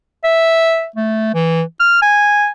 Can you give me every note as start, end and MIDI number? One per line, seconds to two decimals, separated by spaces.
0.24 0.87 76
0.96 1.33 57
1.34 1.62 52
1.80 1.99 89
2.02 2.48 80